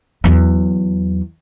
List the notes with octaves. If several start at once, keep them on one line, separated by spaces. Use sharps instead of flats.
E2 F#3